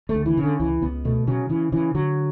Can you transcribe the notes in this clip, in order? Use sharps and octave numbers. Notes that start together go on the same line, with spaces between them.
A3
D2
E3
C#3
D3
C#2 E3
C#2 B3
B2 A3
C#3 F#3
C#3 E3
C#3 E3
D3 F#3